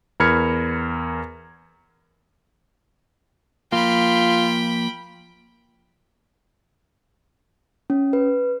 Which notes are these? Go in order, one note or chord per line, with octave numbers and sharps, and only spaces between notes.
E2 A#4 B5 F6 G#6 C#7
F3 A#3 F4 G5 B5
C#4
B4